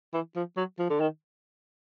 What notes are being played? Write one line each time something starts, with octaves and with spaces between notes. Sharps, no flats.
E3
F3
F#3
F3
D3
D#3